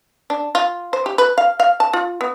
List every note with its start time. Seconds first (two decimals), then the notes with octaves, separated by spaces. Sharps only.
0.30 D4
0.55 F4
0.93 C5
1.06 G4
1.18 B4
1.38 F5
1.60 F5
1.80 A5
1.93 F4
2.21 B3